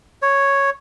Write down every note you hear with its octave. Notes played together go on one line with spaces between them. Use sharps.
C#5